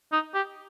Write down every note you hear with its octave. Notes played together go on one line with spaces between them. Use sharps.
D#4
G4